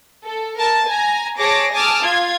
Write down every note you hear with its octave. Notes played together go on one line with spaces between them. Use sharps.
A4
A#4 A5
G#5 A#5
G#4 C#5 A5 D6 A#6
G#5 A5 D6 D#6 F6
F4 G#6